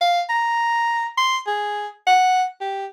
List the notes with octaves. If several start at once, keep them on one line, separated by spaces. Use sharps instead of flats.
F5
A#5
C6
G#4
F#5
G4